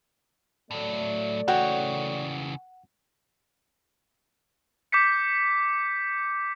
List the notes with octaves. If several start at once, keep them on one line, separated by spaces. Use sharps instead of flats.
A2 F#3 A3 D5
C#3 E3 F#4 C#5 F#5 G5
D6 G6 B6 C#7